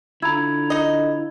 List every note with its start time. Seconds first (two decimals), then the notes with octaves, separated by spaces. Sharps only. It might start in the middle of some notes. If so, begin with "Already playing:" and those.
0.22 D3 E4 F4 A#5 B5 E6 G#6
0.70 D#4 D#5